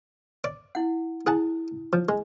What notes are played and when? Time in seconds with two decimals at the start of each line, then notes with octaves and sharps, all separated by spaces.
0.44 D5 D6
0.75 E4 F#5
1.27 E4 G#4 F#5 A5
1.93 F3
2.09 G#3